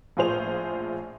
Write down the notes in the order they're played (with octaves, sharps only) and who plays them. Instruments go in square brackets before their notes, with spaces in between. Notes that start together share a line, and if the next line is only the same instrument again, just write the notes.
[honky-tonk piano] A#1 A2 F4 G#4 C5 F7